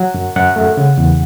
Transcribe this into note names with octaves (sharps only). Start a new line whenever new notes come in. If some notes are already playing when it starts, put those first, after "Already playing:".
Already playing: F#3 F#5
F#2
F#2 F#5
A3
C#3
E2